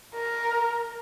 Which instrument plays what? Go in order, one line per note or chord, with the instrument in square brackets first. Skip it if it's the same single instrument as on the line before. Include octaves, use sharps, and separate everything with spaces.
[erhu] A#4